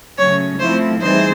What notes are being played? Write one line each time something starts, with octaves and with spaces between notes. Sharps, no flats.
C#3 F#3 A3 C#4 C#5
F3 A3 C4 E4 C5
E3 G3 C4 D#4 G#4 C5